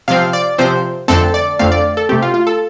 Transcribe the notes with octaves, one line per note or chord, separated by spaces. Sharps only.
C3 F3 C4 F5
D5
C3 F3 C4 C5
F2 D3 A3 C4 A4
D5
F2 D3 A3 C4 F5
D5
A4
C3 A3 C4 G4
F4
F4
A4